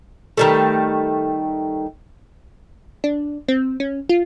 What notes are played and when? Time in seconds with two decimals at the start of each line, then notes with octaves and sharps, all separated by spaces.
0.37 D#3 G3 A3
3.04 D4
3.48 C4
3.80 C#4
4.09 F4